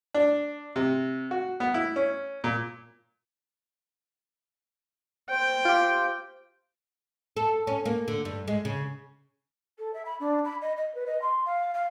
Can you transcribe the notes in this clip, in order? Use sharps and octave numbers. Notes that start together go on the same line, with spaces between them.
D4
C3
F#4
B3
E4
C#4
A#2
C5 G5
F4 G4
A4
C#4
A#3
D3
G2
G#3
C#3
A4
E5
B5
D4
B5
D#5
D#5
B4
D#5
C6
F5
F5